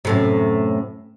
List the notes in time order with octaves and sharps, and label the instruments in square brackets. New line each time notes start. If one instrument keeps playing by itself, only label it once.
[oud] F#2 A2 C3